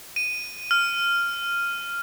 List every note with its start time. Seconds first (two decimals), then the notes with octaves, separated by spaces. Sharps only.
0.16 D#7
0.71 F6